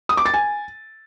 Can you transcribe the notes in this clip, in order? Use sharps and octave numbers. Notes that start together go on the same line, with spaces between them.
D#6
D6
A6
G#5